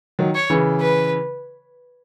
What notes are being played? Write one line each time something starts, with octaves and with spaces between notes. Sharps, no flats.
D#3 F#3
C#5
C#3 E3
B4